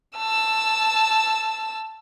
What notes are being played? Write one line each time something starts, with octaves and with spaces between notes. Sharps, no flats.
A5 E6